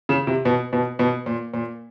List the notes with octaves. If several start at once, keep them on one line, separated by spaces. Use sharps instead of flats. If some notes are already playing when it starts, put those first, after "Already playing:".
C#3
C3
B2
B2
B2
A#2
A#2